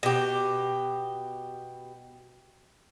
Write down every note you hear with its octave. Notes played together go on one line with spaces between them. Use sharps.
B2 G4